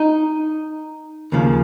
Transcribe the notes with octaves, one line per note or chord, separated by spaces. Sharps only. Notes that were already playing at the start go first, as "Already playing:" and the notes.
Already playing: D#4
D#2 C#3 F3